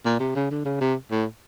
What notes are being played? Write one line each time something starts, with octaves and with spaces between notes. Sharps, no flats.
A#2
C3
C#3
D3
C#3
C3
A2